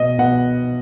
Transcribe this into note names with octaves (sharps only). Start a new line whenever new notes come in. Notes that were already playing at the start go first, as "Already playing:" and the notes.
Already playing: B2 D#5
B2 F#5